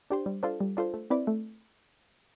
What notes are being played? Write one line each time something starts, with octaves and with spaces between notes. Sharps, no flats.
D4 G4 C5
G3
D4 F4 A4 C5
G3
D4 F4 A4 C5
A3
C4 E4 B4 D5
A3